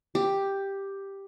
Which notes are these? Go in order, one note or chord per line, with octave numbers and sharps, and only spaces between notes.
G4